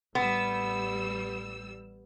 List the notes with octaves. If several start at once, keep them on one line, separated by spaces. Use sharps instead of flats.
A1 G3 B3 E6